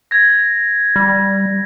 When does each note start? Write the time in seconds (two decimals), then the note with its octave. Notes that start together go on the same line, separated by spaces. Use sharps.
0.11 G#6 A#6
0.96 G3